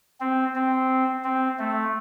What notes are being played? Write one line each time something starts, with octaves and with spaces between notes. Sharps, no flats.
C4
C4
C4
A3